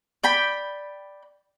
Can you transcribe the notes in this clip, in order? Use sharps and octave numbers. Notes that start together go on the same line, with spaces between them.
D5 G5 B5